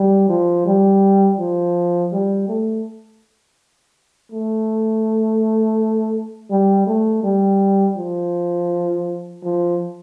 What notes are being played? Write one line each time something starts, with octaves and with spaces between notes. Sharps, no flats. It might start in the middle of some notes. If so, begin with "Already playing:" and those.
Already playing: G3
F3
G3
F3
G3
A3
A3
G3
A3
G3
F3
F3